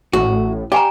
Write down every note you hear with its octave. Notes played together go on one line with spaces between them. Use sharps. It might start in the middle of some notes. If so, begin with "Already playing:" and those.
A1 A2 F#4
G4 D5 G#5 A#5